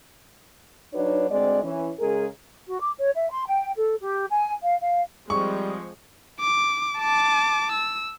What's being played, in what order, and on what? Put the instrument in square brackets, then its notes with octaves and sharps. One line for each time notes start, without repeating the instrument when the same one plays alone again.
[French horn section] F#3 D4 D#4 F#4 B4 C#5
D2 G#3 C4 D5
E3 C#4
C#3 G#3 G#4 A#4
[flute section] F#4
D6
C#5
E5
C6
G5
A4
G4
G#5
F5
F5
[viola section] F3 G#3 C4 [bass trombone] G3 [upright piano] C#6
[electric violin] D6
A5 D6
E6